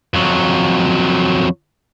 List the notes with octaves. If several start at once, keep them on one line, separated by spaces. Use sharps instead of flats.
F2 F#3